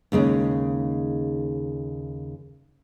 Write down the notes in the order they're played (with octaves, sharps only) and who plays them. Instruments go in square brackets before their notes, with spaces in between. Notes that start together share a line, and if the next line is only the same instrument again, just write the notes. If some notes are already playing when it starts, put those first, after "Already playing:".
[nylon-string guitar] D#2 C#3 G#3 D#4